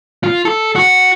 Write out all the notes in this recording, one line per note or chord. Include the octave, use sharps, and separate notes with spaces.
F4
A4
F#4